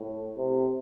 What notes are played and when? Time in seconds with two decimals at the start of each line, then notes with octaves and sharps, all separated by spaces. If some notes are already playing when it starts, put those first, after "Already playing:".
Already playing: A2
0.36 C3